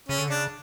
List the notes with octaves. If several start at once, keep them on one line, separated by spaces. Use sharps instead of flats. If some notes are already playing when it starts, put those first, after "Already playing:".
C#3 C#4
D3
C#3 D4